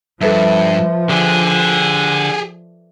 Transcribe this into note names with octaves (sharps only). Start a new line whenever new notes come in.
G2 F3 A4 B4 E5
D3 G4 G#4 D5